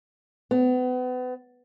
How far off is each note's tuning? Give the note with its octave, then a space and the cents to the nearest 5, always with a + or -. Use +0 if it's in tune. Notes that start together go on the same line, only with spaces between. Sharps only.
B3 +35